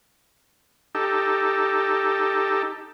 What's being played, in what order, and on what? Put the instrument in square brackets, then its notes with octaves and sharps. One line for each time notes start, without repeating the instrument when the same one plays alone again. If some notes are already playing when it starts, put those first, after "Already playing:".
[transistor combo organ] D#4 G4 A4